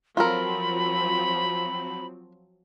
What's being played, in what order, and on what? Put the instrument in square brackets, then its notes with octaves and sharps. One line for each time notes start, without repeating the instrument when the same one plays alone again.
[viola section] F3 F#3 C4 [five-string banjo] F4 A4 A#4 [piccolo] B5